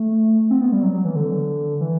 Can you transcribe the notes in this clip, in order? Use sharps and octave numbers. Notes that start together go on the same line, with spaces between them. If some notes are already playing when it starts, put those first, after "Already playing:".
Already playing: A3
C4
B3
G3
F#3
F#3
E3
D3
E3